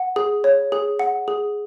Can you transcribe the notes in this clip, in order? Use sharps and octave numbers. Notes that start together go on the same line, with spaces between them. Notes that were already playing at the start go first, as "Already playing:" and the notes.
Already playing: F#5
G#4
C#5
G#4
F#5
G#4